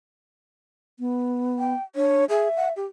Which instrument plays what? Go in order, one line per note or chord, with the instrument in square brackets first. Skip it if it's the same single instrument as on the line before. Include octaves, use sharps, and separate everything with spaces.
[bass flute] B3
[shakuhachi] G5
[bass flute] D4 [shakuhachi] C#5
[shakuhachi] G#4 [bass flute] E5
[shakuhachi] F#5
G4